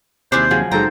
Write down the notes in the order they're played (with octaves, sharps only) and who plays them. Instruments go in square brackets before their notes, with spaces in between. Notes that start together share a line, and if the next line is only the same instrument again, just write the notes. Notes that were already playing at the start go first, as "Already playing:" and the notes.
[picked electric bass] D#2 C3 [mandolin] D4 E4 G#4 [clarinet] C5
[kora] C#3 F3 F#3 [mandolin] G#4
[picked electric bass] F#1 F#3 G#3 [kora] G#2 A4 G5 [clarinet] C5 [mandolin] A#5